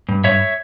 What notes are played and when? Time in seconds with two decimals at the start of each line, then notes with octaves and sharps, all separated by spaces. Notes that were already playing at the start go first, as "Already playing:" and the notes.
0.09 G2
0.24 G2 C#5 E5